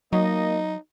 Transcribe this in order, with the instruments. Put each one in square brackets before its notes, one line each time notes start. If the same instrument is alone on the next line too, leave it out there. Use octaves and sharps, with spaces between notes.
[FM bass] F#3 [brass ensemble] A#3 D#5 [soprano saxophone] D#4